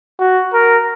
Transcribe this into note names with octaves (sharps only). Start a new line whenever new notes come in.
F#4
A#4